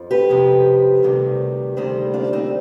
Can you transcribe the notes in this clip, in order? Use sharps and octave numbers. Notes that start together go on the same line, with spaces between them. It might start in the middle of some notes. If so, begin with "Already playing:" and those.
Already playing: F2 F3
G4 B4
F2 C3 F3
D2 C3 D#3 G3
D2 C3 D#3 G3 G#4 C5
D4 F4
C4 D#4